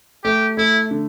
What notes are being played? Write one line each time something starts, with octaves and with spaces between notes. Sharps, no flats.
A3 G4
A3 E4
D3